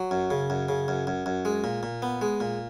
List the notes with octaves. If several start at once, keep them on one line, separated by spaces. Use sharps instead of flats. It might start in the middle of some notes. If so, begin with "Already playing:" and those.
Already playing: F#3
F#2
C#3
F#2
C#3
F#2
F#2
F#2
G#3
A#2
A#2
B3
G#3
A#2